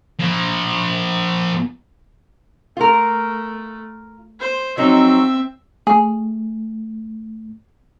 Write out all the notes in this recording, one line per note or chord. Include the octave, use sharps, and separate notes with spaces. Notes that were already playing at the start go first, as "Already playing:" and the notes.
F3 A#3
A3 F4 A#4
C5
F3 F#3 C4 D#4 E5
A3 G#4